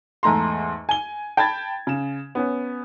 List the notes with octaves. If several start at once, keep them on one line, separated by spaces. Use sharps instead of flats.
E2 G#2 A3 A#5 C6
G#5 G7
G5 A5 B5 G#6 A6
C#3 E7
B3 C#4